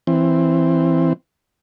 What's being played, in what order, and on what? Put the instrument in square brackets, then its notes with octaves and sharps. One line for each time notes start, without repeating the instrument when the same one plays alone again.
[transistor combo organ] E3 C4